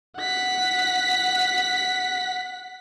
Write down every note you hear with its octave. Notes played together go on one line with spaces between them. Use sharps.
F#5 B6